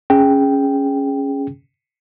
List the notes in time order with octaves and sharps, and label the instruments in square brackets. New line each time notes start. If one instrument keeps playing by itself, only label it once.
[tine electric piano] C#4 G#4 G5